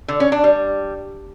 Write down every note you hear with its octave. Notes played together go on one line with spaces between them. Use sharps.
D3
C#4
D4
G3